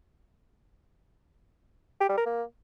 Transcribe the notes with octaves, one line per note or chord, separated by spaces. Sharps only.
G4
G3
A#4
A#3